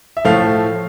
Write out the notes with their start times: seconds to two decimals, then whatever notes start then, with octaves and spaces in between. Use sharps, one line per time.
0.17 E5
0.25 A2 F3 A3 F5